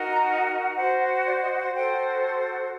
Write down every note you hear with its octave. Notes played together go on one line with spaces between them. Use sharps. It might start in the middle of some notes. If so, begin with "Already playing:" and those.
Already playing: D#4 F#4 A#4
A#5
F#5
F#4 C5 F#5
D5
D#5
F#5
F#4 A4 C5 G5